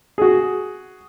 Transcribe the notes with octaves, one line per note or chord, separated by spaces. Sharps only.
F#4 G#4